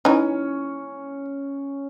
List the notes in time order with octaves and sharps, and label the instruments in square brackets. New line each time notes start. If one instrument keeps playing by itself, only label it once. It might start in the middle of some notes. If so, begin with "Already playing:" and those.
[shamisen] E3 D#4 [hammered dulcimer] C#4